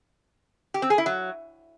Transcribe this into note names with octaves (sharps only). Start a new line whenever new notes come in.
G4
C4
G#4
E4
F#3